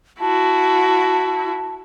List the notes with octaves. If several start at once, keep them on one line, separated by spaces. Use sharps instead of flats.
E4 F#4 A5